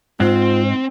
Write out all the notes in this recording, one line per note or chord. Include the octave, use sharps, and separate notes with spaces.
G#2 C4 F4